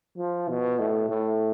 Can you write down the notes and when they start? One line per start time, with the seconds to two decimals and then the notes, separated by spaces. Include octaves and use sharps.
0.18 F3
0.49 B2
0.79 A2
1.09 A2